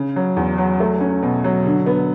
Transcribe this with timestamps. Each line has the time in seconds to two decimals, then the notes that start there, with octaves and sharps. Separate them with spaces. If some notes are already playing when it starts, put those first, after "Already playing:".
Already playing: C#3
0.16 F#3
0.37 E2
0.58 F#3
0.80 A3
1.01 C#4
1.23 B2
1.44 F#3
1.66 D3
1.86 B3